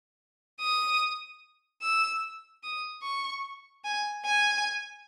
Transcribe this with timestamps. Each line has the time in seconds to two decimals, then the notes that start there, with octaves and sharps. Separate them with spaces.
0.60 D#6
1.82 E6
2.63 D#6
3.03 C#6
3.84 G#5
4.25 G#5